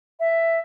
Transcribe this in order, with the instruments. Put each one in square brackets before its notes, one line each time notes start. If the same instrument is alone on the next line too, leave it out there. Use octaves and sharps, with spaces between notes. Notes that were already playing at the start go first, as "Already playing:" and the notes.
[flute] E5